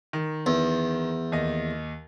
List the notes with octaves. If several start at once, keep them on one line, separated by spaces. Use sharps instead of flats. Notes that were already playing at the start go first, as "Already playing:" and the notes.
D#3
E2
D#2 D#5